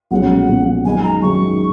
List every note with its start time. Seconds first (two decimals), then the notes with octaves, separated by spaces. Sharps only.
0.11 B1 A#2 F3 G#3 C#4 F#5
0.48 B1 A#2 F3 G#3 C#4
0.85 F#2 D#3 G#3 D#4 G#5
1.03 A#5
1.22 F#2 D#3 G#3 D#4 C#6